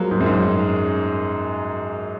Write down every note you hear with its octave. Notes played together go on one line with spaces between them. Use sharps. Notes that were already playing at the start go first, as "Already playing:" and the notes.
Already playing: F3 F#3 G#3 A#3
G#2
F#2
G#2